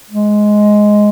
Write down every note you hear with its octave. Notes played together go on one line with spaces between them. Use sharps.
G#3